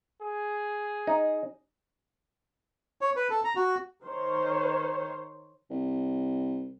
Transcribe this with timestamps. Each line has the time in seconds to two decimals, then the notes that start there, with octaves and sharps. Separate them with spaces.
0.22 G#4
1.07 D#4
3.01 C#5
3.16 B4
3.30 A4
3.44 A#5
3.56 F#4
4.04 D#3 C5 C#5
5.70 C2